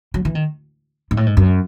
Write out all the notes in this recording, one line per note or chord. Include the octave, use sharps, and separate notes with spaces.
F#3
E3
D#3
G#2
A2
G#2
F#2